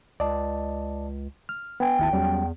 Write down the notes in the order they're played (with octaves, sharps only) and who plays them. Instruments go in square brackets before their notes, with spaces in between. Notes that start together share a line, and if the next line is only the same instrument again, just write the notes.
[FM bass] C#2 [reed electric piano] D5 D#5 A5
[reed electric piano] F6
[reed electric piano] B3 G#5 [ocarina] G5
[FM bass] G#1 [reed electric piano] D#2 E4 A5
[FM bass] E2 [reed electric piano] F#3 G3 C#4